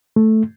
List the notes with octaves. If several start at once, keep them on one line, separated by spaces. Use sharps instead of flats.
A3